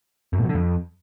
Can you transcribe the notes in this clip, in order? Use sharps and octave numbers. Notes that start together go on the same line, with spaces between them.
F#2
A#2
F#3
D3
F2